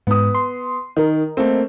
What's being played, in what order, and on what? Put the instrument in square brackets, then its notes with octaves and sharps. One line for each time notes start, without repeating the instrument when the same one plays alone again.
[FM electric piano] G#2 [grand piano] B3 D#6
[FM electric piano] C6
[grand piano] D#3 [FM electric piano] A#4 D#5
[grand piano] A3 A#3 C4